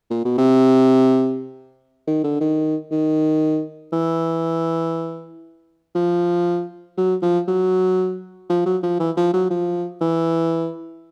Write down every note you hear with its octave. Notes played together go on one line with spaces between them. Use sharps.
A#2
B2
C3
D#3
D3
D#3
D#3
E3
F3
F#3
F3
F#3
F3
F#3
F3
E3
F3
F#3
F3
E3